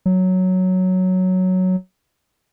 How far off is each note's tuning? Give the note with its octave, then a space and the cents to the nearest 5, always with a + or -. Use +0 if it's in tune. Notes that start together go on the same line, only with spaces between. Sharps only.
F#3 +0